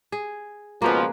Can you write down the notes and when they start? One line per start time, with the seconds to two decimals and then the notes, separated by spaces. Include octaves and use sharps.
0.12 G#4
0.82 C#2 B2 F3 A#3 G#4 B4